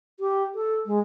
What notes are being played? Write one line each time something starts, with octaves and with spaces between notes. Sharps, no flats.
G4
A4
G#3